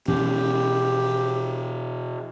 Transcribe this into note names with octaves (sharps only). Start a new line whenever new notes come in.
B2 E3 C#4 G4